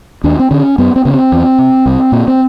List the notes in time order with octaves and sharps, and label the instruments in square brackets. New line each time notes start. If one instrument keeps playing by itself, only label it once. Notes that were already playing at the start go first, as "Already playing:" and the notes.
[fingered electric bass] D#2 D4
C4
D3 C#4
F#2 B3
C4
C#3 B3
C4
E2
C3
C2
A#2
C4